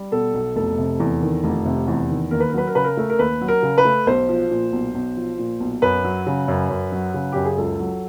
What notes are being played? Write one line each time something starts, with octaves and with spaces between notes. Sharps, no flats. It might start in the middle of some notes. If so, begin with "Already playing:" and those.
Already playing: G3
B2 A4
B1
F1 A4
C3
E2
D#3
F1
C3
E2
D#3
D#2 A#4
B4
A#4
F#3 B4
A#4
C#3 B4
A#4
A3
A#4
D#2 B4
F#3
A#4
C#3
B4
A3
B1 C5
F3
A#2
B1
B1
F3
A#2
B1
F#2 B4
F#3
C#3
F#2
F#2
F#3
C#3
F#2 G4
G#4
C#2 A4
F#3